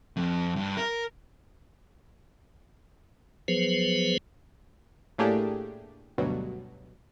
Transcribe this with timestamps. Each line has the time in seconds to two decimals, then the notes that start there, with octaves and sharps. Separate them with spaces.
0.17 F2
0.56 G2
0.77 A#4
3.48 F3 F#3 B3 G#4 B4 C5
5.18 A2 A3 A#3 D4 G4 G#4
6.18 D2 G2 B2 F#3